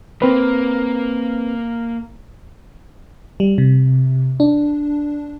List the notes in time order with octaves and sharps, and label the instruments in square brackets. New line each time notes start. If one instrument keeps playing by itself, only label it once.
[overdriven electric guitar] A#3 [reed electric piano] C4 B4
[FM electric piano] G3
C3
D4